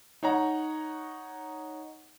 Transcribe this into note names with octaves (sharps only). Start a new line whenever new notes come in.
D#4 C#5 F#5 A#5